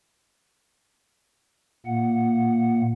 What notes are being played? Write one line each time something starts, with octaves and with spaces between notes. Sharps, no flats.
A#2 A#3 F#5